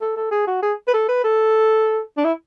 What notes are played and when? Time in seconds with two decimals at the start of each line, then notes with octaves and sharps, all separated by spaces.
0.01 A4
0.17 A4
0.31 G#4
0.47 F#4
0.62 G#4
0.88 B4
0.94 A4
1.08 B4
1.24 A4
2.18 D4
2.25 E4